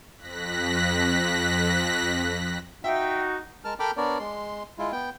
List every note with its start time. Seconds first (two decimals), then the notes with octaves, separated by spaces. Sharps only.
0.18 F2 F#6 A#6 B6
2.84 D#4 F#4 E5 G5
3.65 G#3 A#4 A5 F6
3.80 A4 A#4 G5 B5 D6 F6
3.97 B3 D4 A#4 C#5 D5
4.19 G#3 C6
4.78 G#3 E4 F4
4.92 B3 G5